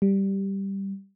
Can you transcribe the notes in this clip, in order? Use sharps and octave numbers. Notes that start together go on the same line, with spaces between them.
G3